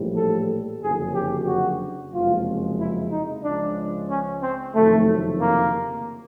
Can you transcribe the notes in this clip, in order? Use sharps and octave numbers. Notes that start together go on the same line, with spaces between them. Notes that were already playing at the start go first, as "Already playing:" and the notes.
Already playing: A#1 A2 E3 G3
A4
F#1 F2 D3 F#3 G#4
G4
F#4
F#1 F2 C3 F3 G#3 F4
E4
D#4
C#2 C#3 F3 G#3 D4
C#4
C4
F#1 F2 C3 D#3 F#3 A3
A#3